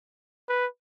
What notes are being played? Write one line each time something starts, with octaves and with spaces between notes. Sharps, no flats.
B4